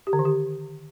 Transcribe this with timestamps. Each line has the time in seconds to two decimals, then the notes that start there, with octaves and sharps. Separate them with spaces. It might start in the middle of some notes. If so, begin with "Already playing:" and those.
0.07 G4
0.13 D3
0.19 D#3
0.25 G4